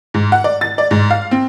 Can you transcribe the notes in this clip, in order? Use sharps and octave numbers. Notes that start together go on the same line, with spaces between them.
G#2
F#5
D5
A6
D5
G#2
F5
C4